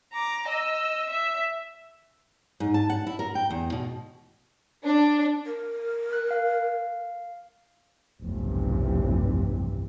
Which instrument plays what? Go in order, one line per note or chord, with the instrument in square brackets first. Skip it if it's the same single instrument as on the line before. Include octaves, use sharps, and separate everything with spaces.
[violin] A#5 D6
D#5 E6
E5
[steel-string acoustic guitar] G#2
A5
F#5
E4
A#4
G5
E2
B2
[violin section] D4
[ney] A#4
[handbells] F#6
F5
[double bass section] F1 B1 E2 G2 C3 E3